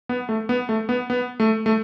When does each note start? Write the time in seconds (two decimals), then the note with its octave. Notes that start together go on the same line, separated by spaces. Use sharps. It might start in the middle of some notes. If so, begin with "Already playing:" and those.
0.09 B3
0.29 A3
0.49 B3
0.69 A3
0.89 B3
1.10 B3
1.40 A3
1.66 A3